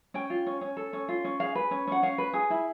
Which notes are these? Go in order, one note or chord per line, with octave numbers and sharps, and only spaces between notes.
C#4 G5
F4
C#4
C#4
A4
C#4
F4
C#4
G#4 F5
B4
C#4
C#4 F#5
C#4 F5
B4
G#4
E4